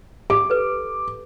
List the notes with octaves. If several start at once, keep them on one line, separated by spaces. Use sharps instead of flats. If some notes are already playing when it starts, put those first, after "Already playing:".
G4 D6
A4 B4